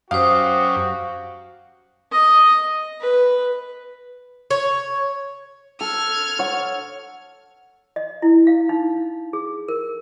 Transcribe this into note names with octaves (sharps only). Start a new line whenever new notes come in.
F#2 F#4 G4 C5 F5 D#6
D#5
B4
C#5
A4 F6 G#6
C#5 F#5
D#5
E4
F5
D#4
G#4
A#4